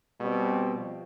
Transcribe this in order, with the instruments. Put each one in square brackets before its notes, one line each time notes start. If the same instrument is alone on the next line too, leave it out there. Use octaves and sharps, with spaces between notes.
[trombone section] B2 G3 C4
F3